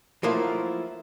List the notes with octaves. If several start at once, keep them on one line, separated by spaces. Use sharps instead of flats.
F3 F#3 A3 A#3 E4 F4